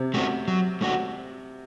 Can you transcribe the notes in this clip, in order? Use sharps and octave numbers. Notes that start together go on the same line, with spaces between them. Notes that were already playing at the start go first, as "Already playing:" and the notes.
Already playing: C3
A3 C#4 F#4
F#3
A3 C#4 F#4